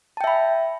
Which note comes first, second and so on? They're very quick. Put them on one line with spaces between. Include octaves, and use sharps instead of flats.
A5 G5 E5 B5